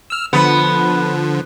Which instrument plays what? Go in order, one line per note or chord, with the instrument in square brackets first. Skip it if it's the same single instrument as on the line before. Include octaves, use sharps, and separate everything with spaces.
[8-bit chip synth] E6 F6
[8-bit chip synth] D3 F3 [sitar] B3